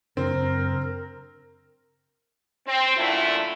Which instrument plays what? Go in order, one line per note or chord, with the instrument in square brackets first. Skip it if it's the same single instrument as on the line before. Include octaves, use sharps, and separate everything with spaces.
[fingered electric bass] F#2 C#3 D4 [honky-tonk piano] C4 [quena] A#4
[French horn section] C4
F#2 A#2 D3 A3 E4 F4